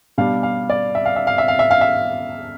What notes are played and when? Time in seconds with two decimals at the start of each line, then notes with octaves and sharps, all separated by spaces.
0.18 B2 G3 D4 F5
0.43 F5
0.70 D5
0.95 E5
1.06 F5
1.16 E5
1.27 F5
1.38 E5
1.48 F5
1.59 E5
1.71 F5
1.81 E5